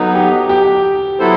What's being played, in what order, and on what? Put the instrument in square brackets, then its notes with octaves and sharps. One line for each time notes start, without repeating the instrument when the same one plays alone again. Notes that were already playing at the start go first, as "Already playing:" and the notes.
Already playing: [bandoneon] F#3 B3 D#4 [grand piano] A4
[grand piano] G4
G4
[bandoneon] F#3 B3 E4 A4 C5